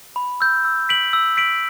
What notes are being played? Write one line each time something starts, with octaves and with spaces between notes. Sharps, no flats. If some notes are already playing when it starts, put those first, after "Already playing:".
B5
E6 G6
E6
B6 D7 F#7
E6
B6 D7 F#7